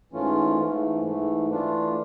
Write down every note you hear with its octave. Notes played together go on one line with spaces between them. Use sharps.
G#2 E3 A3 C#4 F4
G#2 E3 A3
G#2 E3 A3
E3 A3 D4 F4